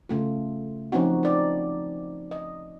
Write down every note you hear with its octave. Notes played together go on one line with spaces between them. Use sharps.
C#3 A3 F4
F3 C4 C#4 D#4 F#4
D#4 D5
D#5